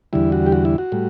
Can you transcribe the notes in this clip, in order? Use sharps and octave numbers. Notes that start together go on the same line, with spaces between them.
E2 D3 G3 E4
F#4
G4
F#4
E4
F#4
A2 G3